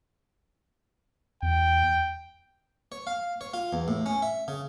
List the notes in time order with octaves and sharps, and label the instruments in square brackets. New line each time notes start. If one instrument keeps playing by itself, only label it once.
[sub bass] E2 [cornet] G5
[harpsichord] C#5
F5
C#5
F4
E2
A2
C#4
E5
C#3